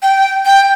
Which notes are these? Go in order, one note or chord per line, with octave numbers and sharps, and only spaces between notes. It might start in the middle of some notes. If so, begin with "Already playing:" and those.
G5
G5